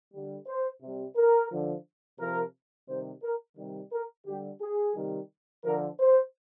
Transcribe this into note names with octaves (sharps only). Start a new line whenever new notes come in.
D3 G3
C5
C3 G3
A#4
D3 F3
C3 F3 A#4
C3 D#3 G3 C5
A#4
C3 D#3 G3
A#4
D3 G3 G4
G#4
C3 D#3 G3
D3 F3 A#4
C5